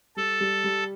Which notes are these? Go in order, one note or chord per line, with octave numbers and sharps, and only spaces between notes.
G3 A4
G3
G3